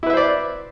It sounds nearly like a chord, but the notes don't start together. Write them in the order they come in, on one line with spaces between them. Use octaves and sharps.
E4 B4 E5 C5 D5